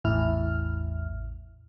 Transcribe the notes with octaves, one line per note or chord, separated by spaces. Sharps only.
A1 E2 A2 E4 F6